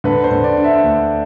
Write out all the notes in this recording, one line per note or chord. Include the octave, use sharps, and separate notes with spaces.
D3 B4
C5
D3
D5
D4
E5
D2